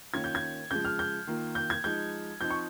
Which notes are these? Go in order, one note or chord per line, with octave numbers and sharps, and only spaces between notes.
D#3 A#3 C#4 F4 G#6
G6
G#6
C#3 F3 G#3 G6
F6
G6
D#3 A#3 F4
G6
G#6
F3 G#3 D#4 G6
F3 C4 D#4 G6
C#6